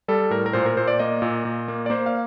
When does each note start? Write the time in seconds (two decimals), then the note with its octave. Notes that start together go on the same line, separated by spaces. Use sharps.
0.08 G3 A4
0.30 A2 A#4
0.46 A#4
0.53 A#2 C5
0.65 A#4
0.77 A#2 C5
0.88 D5
0.99 A#3 D#5
1.22 A#2
1.45 A#2
1.68 A#3
1.86 D5
1.90 A#3 C5
2.06 F5